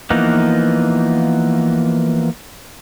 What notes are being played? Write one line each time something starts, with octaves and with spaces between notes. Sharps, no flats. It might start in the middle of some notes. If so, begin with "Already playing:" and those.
E3 F3 A#3 B3 D#4